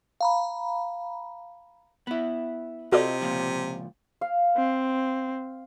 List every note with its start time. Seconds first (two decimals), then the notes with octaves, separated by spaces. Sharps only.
0.21 F5 A#5 B5
2.07 B3 E4
2.92 C3 F4 F#4 A4 D5 D#5
3.21 C#2 A#2 F3
4.21 F5
4.57 C4